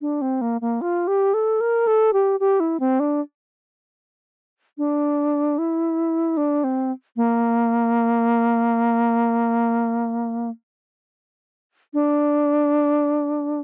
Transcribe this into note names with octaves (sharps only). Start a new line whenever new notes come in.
D4
C4
A#3
A#3
F4
G4
A4
A#4
A4
G4
G4
E4
C4
D4
D4
E4
D4
C4
A#3
D4